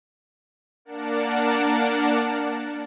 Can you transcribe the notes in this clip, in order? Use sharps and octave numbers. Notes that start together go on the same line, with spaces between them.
A#3 D4 A#4 D5 F#5 A5